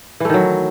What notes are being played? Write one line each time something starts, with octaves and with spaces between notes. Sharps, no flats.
D#3 E3 F#3 A3